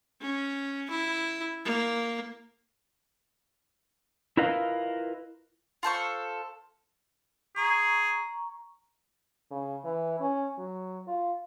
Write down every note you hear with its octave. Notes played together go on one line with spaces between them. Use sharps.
C#4
E4
A#3
E4 F4 A#4 B4 D#5 F5
F4 A4 C5 C#6
G#4 A#5 C#6
C#3
E3
C#4
F#3
F4